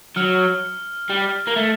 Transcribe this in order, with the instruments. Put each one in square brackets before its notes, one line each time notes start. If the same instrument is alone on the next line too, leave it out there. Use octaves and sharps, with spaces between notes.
[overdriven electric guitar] F#3 [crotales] F6
[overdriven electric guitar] G3
A#3
A3